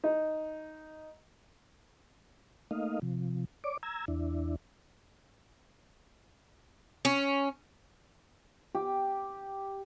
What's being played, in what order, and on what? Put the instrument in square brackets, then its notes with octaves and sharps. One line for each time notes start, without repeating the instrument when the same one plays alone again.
[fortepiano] D#4
[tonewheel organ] A3 A#3 D#4 D#5 F5
C3 F3
C#5 D5 D6
A#5 E6 G#6
E2 D4 E4
[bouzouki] C#4
[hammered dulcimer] G4